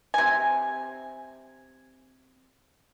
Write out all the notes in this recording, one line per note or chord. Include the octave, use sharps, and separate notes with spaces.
C3 G#5